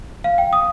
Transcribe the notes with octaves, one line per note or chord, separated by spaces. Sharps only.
F5
G5
D#6